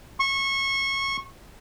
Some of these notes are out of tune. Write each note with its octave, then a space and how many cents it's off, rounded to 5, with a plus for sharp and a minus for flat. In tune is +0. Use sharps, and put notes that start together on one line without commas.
C#6 -25